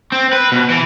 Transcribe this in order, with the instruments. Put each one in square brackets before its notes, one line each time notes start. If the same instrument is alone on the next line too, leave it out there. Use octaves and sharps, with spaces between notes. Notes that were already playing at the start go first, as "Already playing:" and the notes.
[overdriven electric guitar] C4
B4
B2
E3